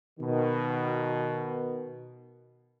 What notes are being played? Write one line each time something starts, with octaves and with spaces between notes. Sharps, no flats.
B2 D#3